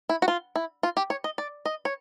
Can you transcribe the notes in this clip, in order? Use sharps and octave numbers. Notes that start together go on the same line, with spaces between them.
E4
F#4
F4
E4
F4
G4
C#5
D#5
D5
D#5
C#5